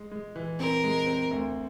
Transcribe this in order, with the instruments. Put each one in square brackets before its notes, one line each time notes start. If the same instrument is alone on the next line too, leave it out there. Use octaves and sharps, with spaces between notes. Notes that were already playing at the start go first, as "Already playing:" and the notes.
Already playing: [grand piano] G#3
G#3
E3
[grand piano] C4 [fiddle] A#4
[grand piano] G#3
C4
D2